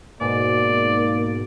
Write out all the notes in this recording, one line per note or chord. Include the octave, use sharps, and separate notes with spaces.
G#2 B2 A#3 D5